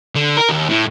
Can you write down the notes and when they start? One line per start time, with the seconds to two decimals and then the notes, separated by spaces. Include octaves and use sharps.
0.15 D3
0.37 A#4
0.49 D#2
0.69 A2